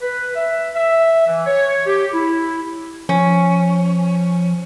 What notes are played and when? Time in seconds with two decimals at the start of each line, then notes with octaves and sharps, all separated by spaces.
0.01 B4
0.36 E5
0.74 E5
1.27 E3
1.47 C#5
1.86 G4
2.13 E4
3.09 F3 C#4